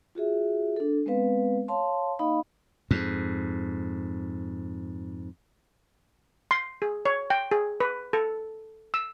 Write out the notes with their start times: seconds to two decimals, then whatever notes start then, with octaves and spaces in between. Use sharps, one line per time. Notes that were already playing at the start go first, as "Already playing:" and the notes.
0.15 F4 F#4 G#4 E5
0.76 D4 A4
1.06 G#3 B3 C4 B4 F5
1.68 C#5 F5 A5 C6
2.19 A#3 D#4 D#5 F5 B5
2.91 F2 G#2
6.51 C6
6.82 G#4
7.05 C#5
7.30 G5
7.51 G#4
7.80 B4
8.13 A4
8.94 E6